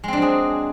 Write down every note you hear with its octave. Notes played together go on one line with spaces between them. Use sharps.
F#3 G#3 C4 D4 G#4